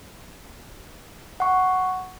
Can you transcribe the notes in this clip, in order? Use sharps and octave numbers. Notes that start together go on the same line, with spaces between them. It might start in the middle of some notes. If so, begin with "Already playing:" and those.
F#5 C#6